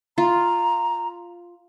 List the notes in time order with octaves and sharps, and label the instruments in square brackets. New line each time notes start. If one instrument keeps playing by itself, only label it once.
[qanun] F4 [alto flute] A#5